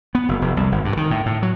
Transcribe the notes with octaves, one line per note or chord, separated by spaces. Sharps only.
B3
F#1
F1
C2
G#1
G2
D#3
A2
A2
F#3